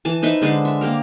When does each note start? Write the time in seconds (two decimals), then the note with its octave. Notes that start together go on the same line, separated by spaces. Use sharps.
0.05 E3 G#5 A5
0.22 D#4 B4 C5 E5
0.42 D3 G#3 B4 C5
0.65 E5
0.81 A#3 G4 A#4